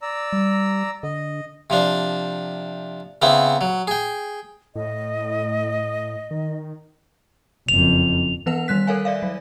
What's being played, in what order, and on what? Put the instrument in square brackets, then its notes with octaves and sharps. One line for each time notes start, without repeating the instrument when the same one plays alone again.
[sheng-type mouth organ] D5 A#5 E6
[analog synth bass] G3
[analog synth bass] D3 [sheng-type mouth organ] D#5
[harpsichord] C3 F3 D4
C#3 B3 C4 E4
F#3
G#4 G5
[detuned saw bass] A2 [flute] D#5
[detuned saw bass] D#3
[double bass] F#1 F2 [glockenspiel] F7
[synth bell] E3 B3 B4 F#5 F7
D#3 G3 F#6 B6
A4 A#4 C#5 F5 G#5
D5 E5 F5
F#3